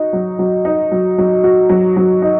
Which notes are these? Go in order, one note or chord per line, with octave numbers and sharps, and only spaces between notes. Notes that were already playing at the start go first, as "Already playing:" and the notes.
Already playing: D#4 F#4
F#3
F#3
D#4
F#3
F#3
F#4
F#3
F#3
D#4